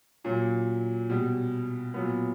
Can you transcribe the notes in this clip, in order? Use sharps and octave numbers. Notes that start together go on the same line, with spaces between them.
A#2 F#3 C#4
B2 G3
A#2 F#3 B3